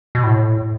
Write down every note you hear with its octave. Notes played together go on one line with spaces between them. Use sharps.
B2
A2